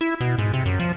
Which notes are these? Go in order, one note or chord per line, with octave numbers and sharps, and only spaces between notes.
E4
B2
G#2
C3
F#2
F3